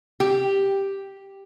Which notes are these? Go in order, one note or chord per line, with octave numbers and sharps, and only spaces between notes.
G4